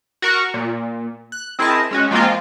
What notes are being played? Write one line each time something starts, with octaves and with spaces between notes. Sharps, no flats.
F#4 A#4 C#6
A#2
F#6
C4 E4 G#4 A#4 D#5 A5
G#3 C#4 F#4
F3 G#3 A#3 C4 F4